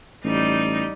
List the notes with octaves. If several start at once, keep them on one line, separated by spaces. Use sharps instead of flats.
A1 G3 D#4